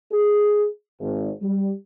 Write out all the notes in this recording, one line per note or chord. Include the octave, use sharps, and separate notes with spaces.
G#4
G#1
G3